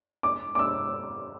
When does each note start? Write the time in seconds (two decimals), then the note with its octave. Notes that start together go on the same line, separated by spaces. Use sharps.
0.23 D6
0.55 D6
0.59 E6